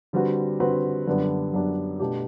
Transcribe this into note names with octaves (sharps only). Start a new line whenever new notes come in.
D3 G3 C4 F#4 B4
D3 G3 C4 F#4 B4
F#2 D3 G3 B3 D4
F#2 D3 G3 B3 D4
B2 A3 D4 G4